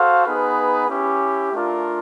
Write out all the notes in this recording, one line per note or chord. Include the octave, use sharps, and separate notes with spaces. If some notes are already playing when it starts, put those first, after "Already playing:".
Already playing: F#4 A4 C5 F5
B3 D#4 G#4 B4
C#4 E4 G4
A3 D4 F4 A#4